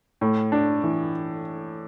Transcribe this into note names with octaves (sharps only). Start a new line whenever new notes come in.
A2
D4
E3